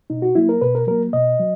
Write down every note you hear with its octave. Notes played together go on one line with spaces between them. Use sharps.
B2 D#4
F#4
F#3 A#3 E4
A#4
B2 B4
A#4
F#3 A#3 A#4
B2 D#5
F#3